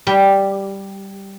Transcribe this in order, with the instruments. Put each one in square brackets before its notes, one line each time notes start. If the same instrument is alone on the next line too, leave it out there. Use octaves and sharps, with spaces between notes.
[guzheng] G3 G4